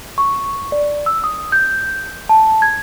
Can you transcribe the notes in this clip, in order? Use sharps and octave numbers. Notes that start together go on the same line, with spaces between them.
C#6
D5
E6
D#6
G6
A5
G#6